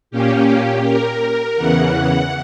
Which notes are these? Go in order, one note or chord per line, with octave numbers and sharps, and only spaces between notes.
A#2 A#3 C#4 G4
A#4
E2 C#3 E3 F#5